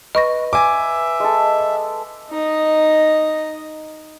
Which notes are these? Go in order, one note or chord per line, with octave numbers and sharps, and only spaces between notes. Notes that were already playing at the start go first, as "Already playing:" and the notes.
B4 D#5 C#6 A#6
E5 G#5 D6
G#3 A4
D#4 D#5